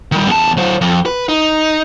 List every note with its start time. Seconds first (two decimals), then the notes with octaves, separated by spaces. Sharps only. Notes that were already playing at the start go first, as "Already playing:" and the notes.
0.12 D#3 G3
0.27 E2 A5
0.57 F#3 C5
0.81 F2
1.06 B4
1.29 D#4